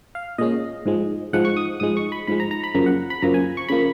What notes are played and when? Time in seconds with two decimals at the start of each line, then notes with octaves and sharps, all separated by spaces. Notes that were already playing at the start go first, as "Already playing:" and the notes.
0.15 F5
0.38 A#2 G#3 C#4 D#5
0.86 G#2 F3 G#3
1.33 G#2 F3 G#3 F#5
1.45 C#6
1.57 D#6
1.80 G#2 F3 G#3 D#6
1.97 C#6
2.12 B5
2.27 G#2 F3 G#3 B5
2.40 A#5
2.51 A#5
2.64 B5
2.74 F#2 C#3 F3 A#3 A#5
2.86 F#5
3.10 B5
3.22 F#2 C#3 F3 A#3 A#5
3.34 G#5
3.57 C#6
3.68 C#3 F3 A#3 B5